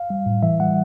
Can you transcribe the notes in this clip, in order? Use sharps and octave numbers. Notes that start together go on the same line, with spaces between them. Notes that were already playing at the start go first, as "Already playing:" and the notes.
Already playing: F5
G3
A2
E3 E5
G3 F#5